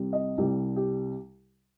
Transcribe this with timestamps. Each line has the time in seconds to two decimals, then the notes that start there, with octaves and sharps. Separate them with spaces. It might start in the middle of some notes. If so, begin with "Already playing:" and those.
Already playing: C2 C3 G3
0.13 D#5
0.38 C2 C3 G3 G4
0.76 G4